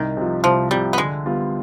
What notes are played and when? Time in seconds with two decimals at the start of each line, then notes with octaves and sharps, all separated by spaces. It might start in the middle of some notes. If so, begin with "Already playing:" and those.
Already playing: C2 D#3
0.17 C3 F3
0.44 C2 F3
0.71 C3 F3 G3
0.93 B3
0.98 D3 G#3
1.26 G3 B3 F4